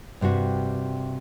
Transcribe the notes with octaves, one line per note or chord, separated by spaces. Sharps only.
G2 C3 G3 F#4